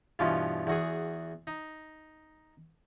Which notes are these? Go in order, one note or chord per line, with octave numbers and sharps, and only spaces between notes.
G2 B2 E3 F3 C#4 F4
E2 F#4 G#4
D#4